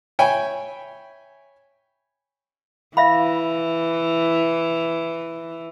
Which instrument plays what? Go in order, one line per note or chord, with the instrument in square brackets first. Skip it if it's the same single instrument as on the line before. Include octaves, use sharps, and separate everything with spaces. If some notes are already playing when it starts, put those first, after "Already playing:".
[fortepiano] C#5 E5 G5 G#5 B5
[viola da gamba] E3 [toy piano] E5 F5 B5